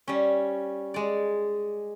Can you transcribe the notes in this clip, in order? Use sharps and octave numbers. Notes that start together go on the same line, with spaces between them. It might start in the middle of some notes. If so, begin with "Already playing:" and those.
G3 C#4
G#3 D5